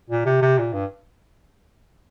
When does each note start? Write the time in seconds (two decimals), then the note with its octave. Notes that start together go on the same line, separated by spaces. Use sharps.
0.10 A#2
0.25 C3
0.42 C3
0.58 A#2
0.73 G2